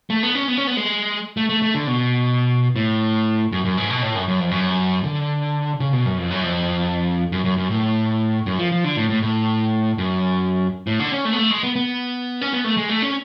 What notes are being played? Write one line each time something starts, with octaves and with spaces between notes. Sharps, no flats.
A3
B3
C#4
B3
C#4
B3
G#3
A3
A3
A3
D3
B2
A2
F#2
F#2
G#2
B2
A2
F#2
F#2
F2
F#2
D3
C#3
B2
F#2
F2
F#2
F2
F#2
F#2
F#2
A2
F#2
F3
F3
D3
A2
A2
A2
F#2
A2
D3
C#4
A3
B3
A3
G#3
B3
B3
C#4
B3
A3
G#3
A3
C#4